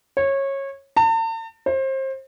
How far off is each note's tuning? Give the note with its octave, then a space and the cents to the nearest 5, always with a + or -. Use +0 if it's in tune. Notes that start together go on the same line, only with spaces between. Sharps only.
C#5 -20
A5 +45
C5 +30